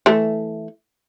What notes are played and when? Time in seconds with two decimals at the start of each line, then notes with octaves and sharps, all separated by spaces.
0.06 E3 A3